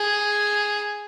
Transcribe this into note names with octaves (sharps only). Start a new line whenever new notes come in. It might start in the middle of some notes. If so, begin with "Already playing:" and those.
Already playing: G#4